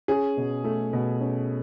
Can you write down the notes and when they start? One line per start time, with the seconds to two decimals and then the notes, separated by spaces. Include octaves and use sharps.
0.08 C#4 G#4
0.37 B2
0.64 A3
0.93 B2
1.21 C#4